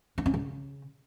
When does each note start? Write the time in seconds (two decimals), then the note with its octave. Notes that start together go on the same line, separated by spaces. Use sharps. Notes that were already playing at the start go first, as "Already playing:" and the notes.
0.18 D4
0.26 C#4
0.34 C#3